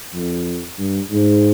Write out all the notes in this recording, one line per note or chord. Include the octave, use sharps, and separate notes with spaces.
F2
G2
G#2